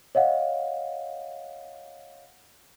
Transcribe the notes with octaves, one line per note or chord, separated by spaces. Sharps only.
C#5 D#5 F5 F#5